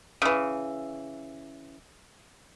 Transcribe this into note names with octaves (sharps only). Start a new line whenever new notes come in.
C#3 E3